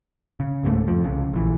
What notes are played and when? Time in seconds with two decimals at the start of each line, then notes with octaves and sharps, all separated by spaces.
0.40 C#3
0.63 C#2 G#2 F3 A3
0.87 F2 F3
1.04 C2 C#3
1.33 A#1 E3